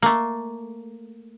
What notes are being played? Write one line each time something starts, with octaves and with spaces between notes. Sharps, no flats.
A3 A#3